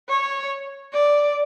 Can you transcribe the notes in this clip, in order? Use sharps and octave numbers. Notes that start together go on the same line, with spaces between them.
C#5
D5